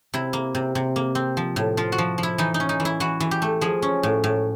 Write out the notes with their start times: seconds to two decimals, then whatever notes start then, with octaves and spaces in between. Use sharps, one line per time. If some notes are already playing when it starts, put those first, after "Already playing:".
0.14 C3 E4
0.33 A#3
0.55 C3
0.75 C3
0.96 A#3
1.15 C4
1.37 F3
1.56 A2
1.77 F3 F4
1.92 F#4
1.98 F3
2.18 F3
2.23 E4
2.38 E3 D#4
2.54 D#4
2.60 C#4
2.69 D#4
2.80 E3
2.85 E4
3.00 E3 F#4
3.20 E3
3.31 G4
3.42 A3
3.61 F3 G#4
3.82 C#4
4.03 A2
4.24 A2